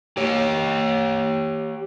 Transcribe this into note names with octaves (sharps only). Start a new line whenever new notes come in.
G4 C#5